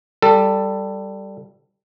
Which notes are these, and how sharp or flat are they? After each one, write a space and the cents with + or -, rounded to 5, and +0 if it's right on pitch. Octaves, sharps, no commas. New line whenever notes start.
G3 +0 A4 +15